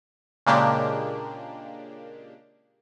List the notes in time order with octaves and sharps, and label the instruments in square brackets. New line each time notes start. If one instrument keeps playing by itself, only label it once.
[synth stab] A#2 C#3 G#3 A#3 D4 G4